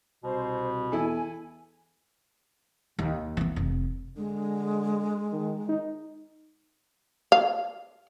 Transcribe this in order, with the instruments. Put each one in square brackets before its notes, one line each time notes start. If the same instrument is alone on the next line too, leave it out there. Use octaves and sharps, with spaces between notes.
[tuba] C2 [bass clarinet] B2 [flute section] C5
[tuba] E2 [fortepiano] E4 A4 [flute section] G#5
[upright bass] D#2
E3 B3
F1
[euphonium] D3 [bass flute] G#3
[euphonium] D#3
D#4
[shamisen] F5